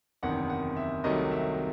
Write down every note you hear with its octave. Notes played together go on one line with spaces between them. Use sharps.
F#1 E2 C3 D#3 F#5
F#5
E5
C2 C3 D#3 F#3 A3 D#5
E5